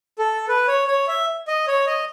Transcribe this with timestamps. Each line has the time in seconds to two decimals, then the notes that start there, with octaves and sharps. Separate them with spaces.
0.19 A4
0.49 B4
0.68 C#5
0.88 C#5
1.08 E5
1.48 D#5
1.67 C#5
1.87 D#5